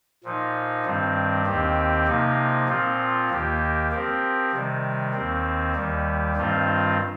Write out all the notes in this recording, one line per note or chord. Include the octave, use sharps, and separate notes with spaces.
A#2 F3 D#4
G2 D#3 G3 C4
D#2 D#3 C4 G4
C3 F3 A#3 D#4
A#2 F3 C4 F4
D#2 D#3 A#3 G4
F3 C4 G4 A#4
C3 D#3 G3
D#2 D#3 C4
D#2 D#3 G3
G2 D#3 G3 C4 F4